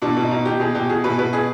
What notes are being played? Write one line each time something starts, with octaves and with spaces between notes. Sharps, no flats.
B2 D4
B2
D#4
B2
B2 G4
B2 G#4
B2 G4
B2 G#4
B2 B4
B2 B4
B2 G#4